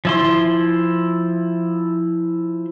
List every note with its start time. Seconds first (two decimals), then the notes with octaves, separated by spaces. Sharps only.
0.05 F3 E4 C6